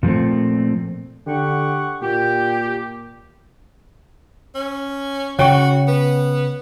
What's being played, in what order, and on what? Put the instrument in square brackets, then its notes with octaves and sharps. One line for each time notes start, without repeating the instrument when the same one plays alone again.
[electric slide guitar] A#2 F3 A3 C4
[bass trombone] D3 [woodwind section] G4 F#5 C#6
[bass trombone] A#2 [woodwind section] G4
[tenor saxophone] C#4
[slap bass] C#3 [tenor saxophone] F#4 [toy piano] C#5 G5 C#6
[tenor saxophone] B3